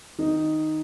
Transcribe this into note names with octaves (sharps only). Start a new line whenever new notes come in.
D#3 D#4